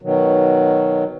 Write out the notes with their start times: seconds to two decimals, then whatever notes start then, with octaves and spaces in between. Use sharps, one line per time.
0.02 B2 D#3 F#3